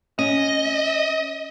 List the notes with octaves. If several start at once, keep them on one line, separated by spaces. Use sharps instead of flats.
C#4 D#5